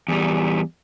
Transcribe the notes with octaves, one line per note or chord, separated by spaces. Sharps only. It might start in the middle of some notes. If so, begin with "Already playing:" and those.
E2 G3